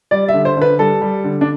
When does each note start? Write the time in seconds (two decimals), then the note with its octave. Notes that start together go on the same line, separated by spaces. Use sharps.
0.11 G3 D5
0.28 E5
0.34 D3
0.45 C5
0.57 D3 B4
0.79 G3 A4
1.02 G3
1.24 D3
1.41 D4